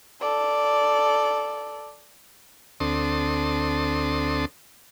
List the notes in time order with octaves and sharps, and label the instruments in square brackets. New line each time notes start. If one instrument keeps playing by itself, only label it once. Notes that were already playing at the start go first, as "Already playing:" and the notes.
[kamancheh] A4 D5
[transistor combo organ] D2 C4 D4 A4 C6 D#6